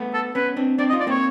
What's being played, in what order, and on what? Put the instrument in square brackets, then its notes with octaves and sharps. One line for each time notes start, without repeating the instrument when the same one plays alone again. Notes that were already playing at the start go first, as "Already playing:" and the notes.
Already playing: [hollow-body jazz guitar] A3 B3
[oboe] A4
[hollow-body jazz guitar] B3 C#4 [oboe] B4
[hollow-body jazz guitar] C4 D4
[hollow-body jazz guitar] C4 D4 [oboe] D5
[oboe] D#5
[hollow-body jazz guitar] D#4 F4
[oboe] D5
[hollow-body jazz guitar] A#3 C4 [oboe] C#5